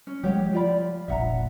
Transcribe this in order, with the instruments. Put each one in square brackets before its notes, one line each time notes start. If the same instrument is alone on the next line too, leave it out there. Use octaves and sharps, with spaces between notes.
[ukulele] C#4
[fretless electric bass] F3 G3 G#3 [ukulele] G4 C#5 F#5
[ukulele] F4 D5 B5
[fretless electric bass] F1 A#1 [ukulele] E5 F#5 A#5